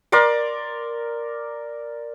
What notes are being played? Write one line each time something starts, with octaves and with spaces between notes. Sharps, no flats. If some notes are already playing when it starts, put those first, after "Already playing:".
A#4 D5 C6 D6